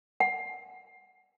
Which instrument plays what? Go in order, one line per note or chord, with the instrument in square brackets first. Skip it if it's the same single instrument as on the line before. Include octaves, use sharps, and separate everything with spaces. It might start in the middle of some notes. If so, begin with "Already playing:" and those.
[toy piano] F#5